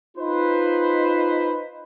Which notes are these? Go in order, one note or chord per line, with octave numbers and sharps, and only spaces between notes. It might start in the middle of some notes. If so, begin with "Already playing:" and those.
D#4 F4 B4 C5